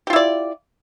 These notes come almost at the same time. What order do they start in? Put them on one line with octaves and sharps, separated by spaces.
G4 F4 E4 D5